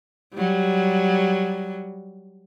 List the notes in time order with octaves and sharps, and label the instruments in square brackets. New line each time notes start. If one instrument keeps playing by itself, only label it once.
[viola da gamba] F#3 G3